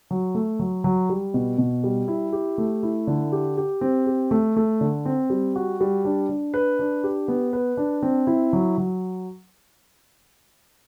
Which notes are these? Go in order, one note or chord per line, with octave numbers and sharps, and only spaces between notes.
F#3
A3
F#3
F#3
G3
B2
B2
G3
E4
G4
A3
E4
D3
G4
G4
C4
G4
A3
A3
D3
C4
G3
F#4
G3
D4
D4
B4
D4
G4
B3
B4
D4
C4
E4
F#3
F#3